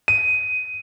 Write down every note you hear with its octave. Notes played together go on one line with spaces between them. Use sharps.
D#7